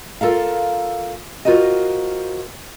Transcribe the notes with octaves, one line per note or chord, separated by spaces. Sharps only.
F4 A4 A#4 F5
F4 F#4 A#4 C5 D#5